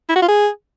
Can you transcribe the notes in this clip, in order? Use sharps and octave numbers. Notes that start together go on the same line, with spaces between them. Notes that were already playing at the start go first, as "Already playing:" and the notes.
E4
F#4
F4
G#4